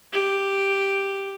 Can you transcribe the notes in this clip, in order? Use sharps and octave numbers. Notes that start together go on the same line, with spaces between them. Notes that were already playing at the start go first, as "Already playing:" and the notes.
G4